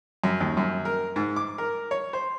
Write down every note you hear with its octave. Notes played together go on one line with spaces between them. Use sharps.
F#2
D#2
F#2
A#4
G#2
D6
A#4
C#5
C5